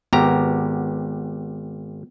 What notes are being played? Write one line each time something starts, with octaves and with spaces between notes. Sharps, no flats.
G#1 B3 G4 A#5